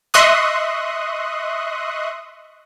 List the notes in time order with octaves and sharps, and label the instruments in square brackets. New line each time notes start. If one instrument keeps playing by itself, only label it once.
[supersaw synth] D#5 E5 C6 C#6 D#6 F#6